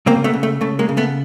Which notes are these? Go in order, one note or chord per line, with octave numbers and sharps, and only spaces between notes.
C#3 A#3 C4
A3 B3
C#3
A3
C#3 A3
G#3 A#3
C#3
A3 B3